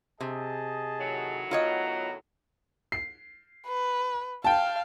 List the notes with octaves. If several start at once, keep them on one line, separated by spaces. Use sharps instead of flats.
C3 G#4 D#5 A5
A2 D#3 F#3
B3 F4 C#5 D#5 F#5 A#5
C7
B4
F5 G5 A5